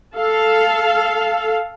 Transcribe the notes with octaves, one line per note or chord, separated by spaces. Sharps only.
A4 F5